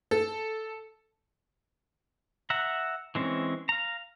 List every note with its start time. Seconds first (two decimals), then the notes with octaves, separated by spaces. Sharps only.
0.11 A4
2.50 E5 F#5 A#5
3.15 E3 G#3 C4 C#4
3.69 F5 A#5